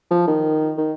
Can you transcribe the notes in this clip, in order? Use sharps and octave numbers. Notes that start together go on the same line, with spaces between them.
F3
D#3
D#3